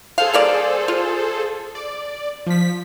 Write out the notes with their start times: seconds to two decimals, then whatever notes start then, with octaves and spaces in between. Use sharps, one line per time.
0.18 G#4 A4 C5 F5
0.33 G3 A#3 D5
0.88 F4
1.75 D5
2.46 F3 B6